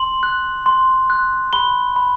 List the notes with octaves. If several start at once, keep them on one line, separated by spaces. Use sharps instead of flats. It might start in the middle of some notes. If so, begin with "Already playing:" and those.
Already playing: C6 F#7
F#6
C6
F#6
B5 G7
B5